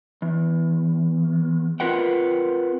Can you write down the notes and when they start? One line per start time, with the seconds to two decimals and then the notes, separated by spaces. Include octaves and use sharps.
0.22 E2
1.80 C4 F4 A#4 B4 F#5 G5